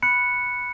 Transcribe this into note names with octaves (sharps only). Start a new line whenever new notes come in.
B5 F#6 C#7